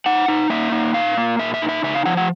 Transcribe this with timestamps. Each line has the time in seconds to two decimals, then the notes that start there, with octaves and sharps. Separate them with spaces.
0.06 D#4 F#5
0.28 D#4
0.50 A#3 E5
0.72 D#4
0.94 A#2 F5
1.17 A#3
1.39 A#2 E5
1.54 E5
1.62 D#4
1.69 E5
1.83 C#3 E5
1.95 F5
2.06 F3 F#5
2.17 F#5